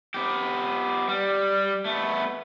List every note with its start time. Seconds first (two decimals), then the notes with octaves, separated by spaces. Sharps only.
0.14 B3 G4
1.08 G3
1.85 A3 B3